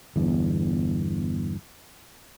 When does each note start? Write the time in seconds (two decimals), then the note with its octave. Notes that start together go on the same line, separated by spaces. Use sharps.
0.16 G1 E2